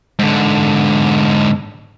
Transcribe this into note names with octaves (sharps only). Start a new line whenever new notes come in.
G#2 D3